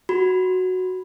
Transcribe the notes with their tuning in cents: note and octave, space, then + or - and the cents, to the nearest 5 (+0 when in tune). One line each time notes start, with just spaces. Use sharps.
F#4 +0 B5 +0